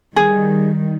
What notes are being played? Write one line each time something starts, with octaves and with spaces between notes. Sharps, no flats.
D#3 G3 G#4